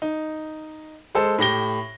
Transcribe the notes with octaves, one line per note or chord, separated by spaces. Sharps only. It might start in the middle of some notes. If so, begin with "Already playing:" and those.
D#4
G#3 A4 C5
A2 G4 A#6 G7